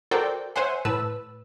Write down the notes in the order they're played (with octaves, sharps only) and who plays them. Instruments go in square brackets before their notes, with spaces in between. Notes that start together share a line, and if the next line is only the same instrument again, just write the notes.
[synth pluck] F#4 A4 A#4 C5 D5 G5
C5 C#5 E5 F#5 G#5 C6
A2 B4 A5 E6